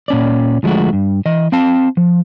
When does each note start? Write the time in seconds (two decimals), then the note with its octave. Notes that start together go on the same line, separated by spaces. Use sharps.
0.08 A#2 C#4 D5
0.63 D2 F3 G#3 A3 F#4
0.93 G2
1.26 E3 D#5
1.52 C4 F5 A5
1.97 F3